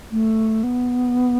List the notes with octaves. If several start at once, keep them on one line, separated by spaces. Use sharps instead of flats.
A3
B3